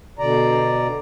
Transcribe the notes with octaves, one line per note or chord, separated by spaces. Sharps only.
B2 D3 D5 A#5